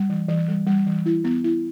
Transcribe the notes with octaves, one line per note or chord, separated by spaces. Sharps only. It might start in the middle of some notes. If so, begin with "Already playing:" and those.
Already playing: G3
E3
E3
G3
G3
E3
E4
B3
E4